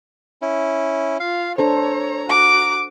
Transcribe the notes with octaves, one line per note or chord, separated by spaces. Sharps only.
C#4 E4
F4 F5
D4 A4 C5 C#5 A#5
F#4 D6